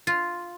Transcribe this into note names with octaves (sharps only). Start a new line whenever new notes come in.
F4